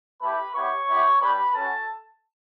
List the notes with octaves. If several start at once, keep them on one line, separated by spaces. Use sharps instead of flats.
A3 E4 G4 B4 B5
B3 E4 G4 C#5 C#6
B3 E4 G4
G3 D4 G4 B4 B5
C#4 F#4 A4 A5